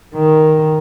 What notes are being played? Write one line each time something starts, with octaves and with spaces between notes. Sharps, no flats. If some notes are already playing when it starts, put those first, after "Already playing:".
D#3